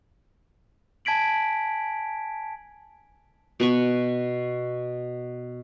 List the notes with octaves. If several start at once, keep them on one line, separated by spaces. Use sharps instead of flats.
G#5 A5 G#6 B6 D7 F#7
B2 B4 C#6